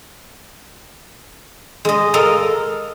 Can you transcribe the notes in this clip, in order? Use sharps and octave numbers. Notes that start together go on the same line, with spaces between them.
G#3 D#5
A4 A#4 D#5 F5